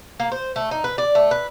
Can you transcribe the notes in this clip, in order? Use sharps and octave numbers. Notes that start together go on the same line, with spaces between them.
A#3
C5
A3
D#4
B4
D5
A3
B4